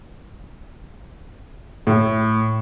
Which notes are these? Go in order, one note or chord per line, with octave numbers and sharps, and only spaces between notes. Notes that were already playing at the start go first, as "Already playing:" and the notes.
A2